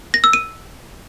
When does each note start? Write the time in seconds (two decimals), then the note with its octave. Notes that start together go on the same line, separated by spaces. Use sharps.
0.14 A#6
0.24 E6
0.33 D#7